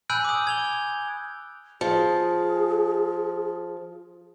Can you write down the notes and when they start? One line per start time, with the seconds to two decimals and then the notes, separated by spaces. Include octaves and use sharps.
0.09 G#5 B5 E6 F#6 G6 D7
0.25 D6 D#6
0.47 G#6 F7 G7
1.81 F3 G#4